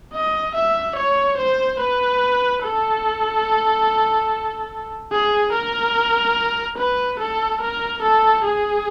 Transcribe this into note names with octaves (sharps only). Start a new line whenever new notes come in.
D#5
E5
C#5
C5
B4
A4
G#4
A#4
B4
A4
A#4
A4
G#4